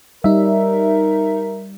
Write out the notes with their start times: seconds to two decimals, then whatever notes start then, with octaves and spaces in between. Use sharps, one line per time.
0.24 G3 D#4 A#4 E5